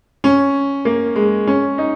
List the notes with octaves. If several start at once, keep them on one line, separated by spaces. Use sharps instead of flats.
C#4
A#3
G#3
C#4
D#4